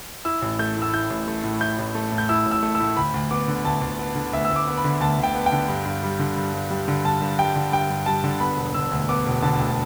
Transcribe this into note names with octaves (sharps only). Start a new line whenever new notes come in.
E4 E6
A1
A3 G6
A2
E6
E4 G6
A1
A3
A2
E4 G6
A1
A3
A2
G6
E4 E6
A1
E6
A3
E6
A2
D2 B5
D2
B3 D6
D3
D2 A5
D2
B3
D3
D2 E5
E6
D2
D6
B3
B5
D3
D2 A5
D2
G5
B3
G5
D3
G2
G2
G3
D3
G2
G2
G3
D3
G2 A5
G2
G3 G5
D3
G2 G5
G2
G3 A5
D3
B3 B5
E1
D3 E6
D2
B3 D6
E1
D3 A5
D2